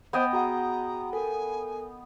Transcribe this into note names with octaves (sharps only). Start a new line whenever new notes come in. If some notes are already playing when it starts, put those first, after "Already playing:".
B3 C5 D#5 G5
F#4 G#4 F#5 A#5
A4 A#4 G#5